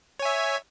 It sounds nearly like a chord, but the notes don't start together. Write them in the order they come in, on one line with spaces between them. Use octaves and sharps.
C#5 G#5 E5